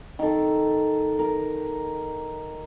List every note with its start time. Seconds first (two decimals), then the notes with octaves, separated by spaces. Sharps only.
0.19 D#3 A4
1.19 A#4